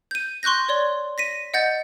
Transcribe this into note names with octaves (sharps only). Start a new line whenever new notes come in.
G6 D#7
C6 C#6 F#6 G6 A#6
C#5 D5 C6
A#6 B6 D#7
D#5 F#5 G6 A6